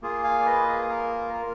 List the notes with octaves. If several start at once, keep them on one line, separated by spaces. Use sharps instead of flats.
A#3 F4 G#4
F5 G#5
D5
B4 D#5
G#4
A#4
A#4